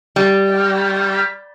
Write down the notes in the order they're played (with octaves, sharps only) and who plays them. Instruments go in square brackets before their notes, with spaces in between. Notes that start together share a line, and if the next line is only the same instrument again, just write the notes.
[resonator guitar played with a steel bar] G3